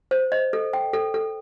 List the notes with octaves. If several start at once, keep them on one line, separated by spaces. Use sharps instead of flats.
C5
D#5
A4
G5
A4
A4